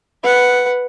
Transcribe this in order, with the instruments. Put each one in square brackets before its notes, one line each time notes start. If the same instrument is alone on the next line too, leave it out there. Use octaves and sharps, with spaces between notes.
[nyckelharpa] B4 F#5